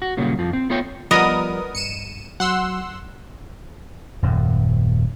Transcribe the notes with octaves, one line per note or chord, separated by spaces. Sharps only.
F#4
A#2 C#3 F#3 G3 A#3
F2 F3
C4
A3 B3 F4 A4 C#5 G5
F3 G3 B3 A#4 D5 D#5 D#6
G2 C#7 D#7 E7
F#3 F#5 C6 E6
D#1 F#2